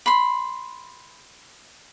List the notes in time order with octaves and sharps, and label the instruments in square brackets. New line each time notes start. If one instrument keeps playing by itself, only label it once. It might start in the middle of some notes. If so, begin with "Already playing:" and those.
[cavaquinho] B5 C6